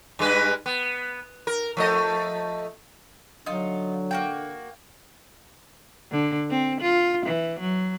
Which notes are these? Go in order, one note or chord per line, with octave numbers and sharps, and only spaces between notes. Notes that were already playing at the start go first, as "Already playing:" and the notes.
G2 G#3 B4
B3
A#4
F3 A3 D#5
D3 F#3 D#4 F4
A#3 F#4 G5
D3
C4
F4
E3
F#3